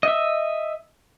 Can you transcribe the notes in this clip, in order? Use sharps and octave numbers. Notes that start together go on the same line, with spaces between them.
D#5 E5